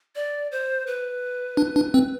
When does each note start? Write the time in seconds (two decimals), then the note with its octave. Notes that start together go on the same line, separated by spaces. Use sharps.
0.15 D5
0.52 C5
0.87 B4
1.57 D4
1.76 D4
1.94 C4